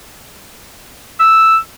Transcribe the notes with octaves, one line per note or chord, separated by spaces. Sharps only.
E6